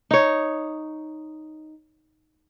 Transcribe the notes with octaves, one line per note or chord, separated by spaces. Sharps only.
D#4 C#5